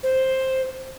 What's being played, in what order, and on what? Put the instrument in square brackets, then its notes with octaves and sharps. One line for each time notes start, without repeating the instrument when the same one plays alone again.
[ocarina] C5